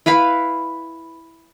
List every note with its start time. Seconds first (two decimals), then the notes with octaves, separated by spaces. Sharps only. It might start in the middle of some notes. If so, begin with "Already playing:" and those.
0.06 E4 B4 F5 B5